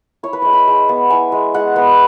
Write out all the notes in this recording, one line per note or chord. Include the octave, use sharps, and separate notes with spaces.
E4 C#5
B4
G#3 C#5
B5
G#3
B3
E4 G#5
G#3
G#3 F#5
B3